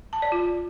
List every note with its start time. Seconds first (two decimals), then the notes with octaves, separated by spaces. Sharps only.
0.13 A5
0.22 D5
0.32 F4